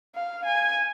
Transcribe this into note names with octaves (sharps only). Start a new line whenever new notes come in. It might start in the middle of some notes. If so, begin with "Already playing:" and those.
F5
G#5